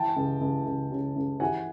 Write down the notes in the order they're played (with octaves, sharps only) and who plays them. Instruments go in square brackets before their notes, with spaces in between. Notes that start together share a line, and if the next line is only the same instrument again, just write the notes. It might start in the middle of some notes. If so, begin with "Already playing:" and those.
Already playing: [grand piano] E3 G5 A5
C#2
C#2
C#2
C#3
C#2
E3 F#5 G#5